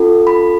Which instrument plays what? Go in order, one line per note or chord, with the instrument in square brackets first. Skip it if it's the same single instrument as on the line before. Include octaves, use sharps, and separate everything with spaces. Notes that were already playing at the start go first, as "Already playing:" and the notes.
Already playing: [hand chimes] C#4 F4 A4
B5